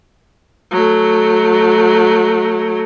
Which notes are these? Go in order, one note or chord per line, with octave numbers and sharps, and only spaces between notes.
F#3 A3